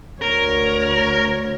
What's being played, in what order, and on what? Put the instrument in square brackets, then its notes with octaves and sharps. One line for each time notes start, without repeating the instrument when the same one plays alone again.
[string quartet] D2 C#5 [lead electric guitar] A#4